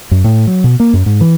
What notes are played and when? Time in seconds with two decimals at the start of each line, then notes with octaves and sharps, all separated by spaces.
0.11 F#2
0.24 A2
0.47 F#3
0.64 B2
0.80 A#3
0.93 F#2
1.06 G#2
1.21 E3